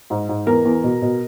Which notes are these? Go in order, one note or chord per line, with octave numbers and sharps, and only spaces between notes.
G#2
G#2
E2 A#4
E2
B2
B2